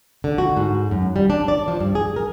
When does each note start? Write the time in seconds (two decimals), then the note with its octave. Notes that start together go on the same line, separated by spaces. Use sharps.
0.24 D3
0.38 F#4
0.57 G#2
0.91 F#2
1.16 G3
1.30 D4
1.48 D5
1.68 F3
1.81 G2
1.95 G#4
2.16 A#4